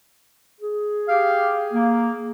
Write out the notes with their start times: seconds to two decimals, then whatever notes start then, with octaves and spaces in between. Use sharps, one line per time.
0.61 G#4
1.08 G4 F5
1.73 A#3